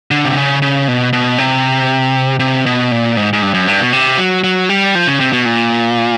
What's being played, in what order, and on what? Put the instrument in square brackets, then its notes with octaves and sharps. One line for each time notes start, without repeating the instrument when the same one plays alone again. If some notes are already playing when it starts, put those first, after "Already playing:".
[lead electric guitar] D3
C3
C#3
C#3
B2
B2
C3
C3
B2
A#2
G#2
G#2
G2
F#2
G2
B2
C3
F#3
F#3
G3
F3
C#3
C3
B2
A#2